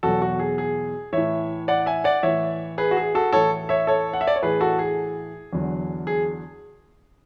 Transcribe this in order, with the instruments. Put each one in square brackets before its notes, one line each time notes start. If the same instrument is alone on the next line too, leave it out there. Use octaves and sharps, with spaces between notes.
[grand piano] E2 B2 F#3 F#4 A4
F#4
G#4
G#4
A2 E3 C#5 E5
D5 F#5
E5 G#5
D5 F#5
A2 E3 C#5 E5
G#4 B4
F#4
G#4
F#4 A4
A2 E3 A4 C#5
C#5 E5
A4 C#5
F#5
E5
D5
C#5
A2 E3 G#4 B4
F#4 A4
G#4
E2 D3 F#3
G#4